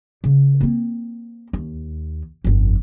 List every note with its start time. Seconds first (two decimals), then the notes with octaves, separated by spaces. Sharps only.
0.24 C#3
0.61 A#3 C4
1.53 D#2
2.44 G1 F2